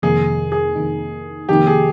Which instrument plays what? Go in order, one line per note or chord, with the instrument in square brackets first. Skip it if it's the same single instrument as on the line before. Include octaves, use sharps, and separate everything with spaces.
[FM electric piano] F2 C3 D#3 A#3 D#4 [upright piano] G#4
[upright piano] G#4
[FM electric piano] F2 C3 D#3 A#3 D#4
[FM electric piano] F2 C3 D#3 A#3 D#4 [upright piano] G4
[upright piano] G#4